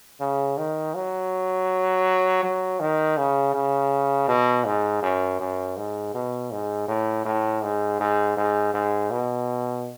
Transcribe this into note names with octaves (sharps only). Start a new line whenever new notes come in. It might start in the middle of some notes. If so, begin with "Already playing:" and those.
C#3
D#3
F#3
F#3
D#3
C#3
C#3
B2
G#2
F#2
F#2
G#2
B2
G#2
A2
A2
G#2
G#2
G#2
G#2
B2